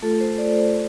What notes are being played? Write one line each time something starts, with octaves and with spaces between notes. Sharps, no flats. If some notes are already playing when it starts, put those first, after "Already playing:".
A3 F4 A4
C5
D5
C5